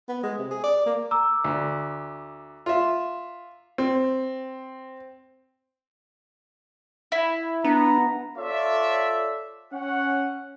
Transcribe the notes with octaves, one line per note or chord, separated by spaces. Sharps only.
B3
G#3
C3
G#4
D5
A#3
A#5 D6 E6
D2
F4 E5
C4
E4
B3 D4 A#5
F4 A4 C#5 D5 E5
C#4 F#5